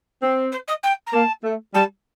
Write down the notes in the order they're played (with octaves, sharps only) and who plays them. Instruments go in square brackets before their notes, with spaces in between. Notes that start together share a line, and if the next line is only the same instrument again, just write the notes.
[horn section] C4
[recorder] C5
D#5
G5
A#5
[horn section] A#3 [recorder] A5
[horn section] A3
[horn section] G3 [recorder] A5